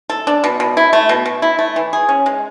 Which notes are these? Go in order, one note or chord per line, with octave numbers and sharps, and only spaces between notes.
A4
D4
B2
B2
E4
A3
B2
B2
E4
A3
E3
G#4
C#4
G#3